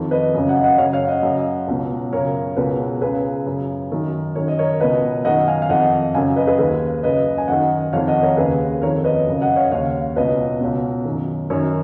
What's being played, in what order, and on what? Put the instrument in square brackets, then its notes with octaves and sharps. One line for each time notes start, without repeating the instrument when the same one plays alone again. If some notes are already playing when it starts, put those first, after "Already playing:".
Already playing: [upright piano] F2 D#3
B4 D#5
F#2 C#3
D#5 F#5
D#5 F#5
F#2 C#5 F5
C#3
C#5 F5
D#5 F#5
F#2 C#3
C#2 B2
F#2 C#3 A#4 C#5
C#2 B2 G#4 B4
C#2 C#3 G#4 B4
F#2 C#3
F#2 D#3
F#2 D#3 C#5
D#5
A#4 C#5
C#2 B2 B4 D#5
F#2 D#3 D#5 F#5
F5 G#5
F5
F2 D#3 D#5 F#5
F#2 C#3 F5 G#5
B4 D#5
G#4 B4
D#2 D#3 G#4 B4
F#2 C#3 B4 D#5
G#5
F#2 D#3 D#5 F#5
F2 D#3 C#5 F5
D#5 F#5
A#4 C#5
D#2 C#3 G#4 B4
F2 D#3 A#4 C#5
B4 D#5
F#2 C#3
D#5 F#5
C#5 F5
D#2 C#3 C#5 F5
C#2 B2 B4 D#5
C#2 B2
F#2 D#3
F#2 D#3 A#4 C#5